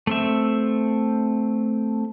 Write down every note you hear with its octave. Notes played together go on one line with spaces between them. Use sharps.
A3 C4 E5